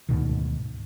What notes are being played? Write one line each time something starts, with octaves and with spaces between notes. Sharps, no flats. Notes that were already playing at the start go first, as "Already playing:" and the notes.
D2 G#2 B2 D#3